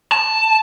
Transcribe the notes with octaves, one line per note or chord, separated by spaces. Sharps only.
A5